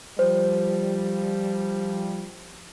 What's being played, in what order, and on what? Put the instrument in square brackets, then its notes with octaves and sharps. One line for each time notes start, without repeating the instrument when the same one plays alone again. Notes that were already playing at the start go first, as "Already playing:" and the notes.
[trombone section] F3 G3 [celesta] C5